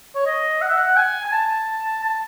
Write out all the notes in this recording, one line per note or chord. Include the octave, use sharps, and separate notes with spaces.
C#5
D#5
F#5
E5
F#5
G#5
G#5
A5
A5